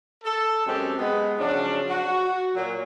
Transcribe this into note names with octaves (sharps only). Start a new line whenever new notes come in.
A4
F#2 G#3 C4 G4 A4
G#3 B3
C#3 F3 F#3 D4
F#4
A#2 F#3